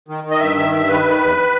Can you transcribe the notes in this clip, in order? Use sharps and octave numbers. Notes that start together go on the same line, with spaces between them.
D#3
D#3
D#5
G2 E5
D#3 E5
G2 E5
D#3 B4
D#3
E2